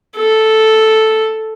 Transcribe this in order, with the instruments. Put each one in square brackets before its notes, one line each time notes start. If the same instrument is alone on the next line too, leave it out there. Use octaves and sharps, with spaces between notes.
[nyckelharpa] A4